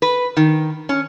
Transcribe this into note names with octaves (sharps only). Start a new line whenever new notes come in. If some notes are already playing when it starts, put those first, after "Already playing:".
B4
D#3
C#4